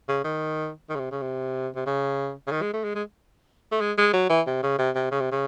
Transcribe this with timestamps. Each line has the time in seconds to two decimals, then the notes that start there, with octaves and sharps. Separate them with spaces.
0.08 C#3
0.24 D#3
0.89 D#3
0.95 C#3
1.00 C3
1.11 C#3
1.22 C3
1.75 C3
1.86 C#3
2.47 C#3
2.52 D#3
2.62 G#3
2.73 A3
2.84 G#3
2.95 G#3
3.72 A3
3.81 G#3
3.98 G#3
4.13 F#3
4.30 E3
4.47 C3
4.63 C#3
4.79 C3
4.96 C3
5.11 C#3
5.21 C3
5.31 C#3